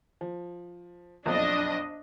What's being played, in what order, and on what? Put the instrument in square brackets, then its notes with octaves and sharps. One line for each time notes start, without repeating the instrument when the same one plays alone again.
[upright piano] F3
[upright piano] F#1 B1 F2 [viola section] D4 D#5